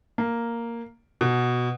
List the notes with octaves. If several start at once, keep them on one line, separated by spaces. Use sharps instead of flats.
A#3
B2